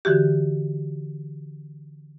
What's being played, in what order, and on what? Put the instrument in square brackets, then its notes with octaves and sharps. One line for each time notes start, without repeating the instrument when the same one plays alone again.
[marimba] D3 E3 F#4 G4